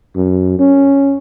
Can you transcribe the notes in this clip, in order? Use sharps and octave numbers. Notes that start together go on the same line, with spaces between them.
F#2
C#4